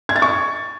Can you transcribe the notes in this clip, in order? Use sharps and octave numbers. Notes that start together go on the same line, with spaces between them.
G#6
A6
C#6